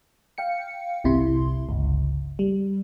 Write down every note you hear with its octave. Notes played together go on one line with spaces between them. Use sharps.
F5 G5 C#7
G1 C2 C3 E4 C6
G1 C#2
G3